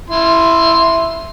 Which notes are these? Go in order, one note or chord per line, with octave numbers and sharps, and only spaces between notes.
E4 C6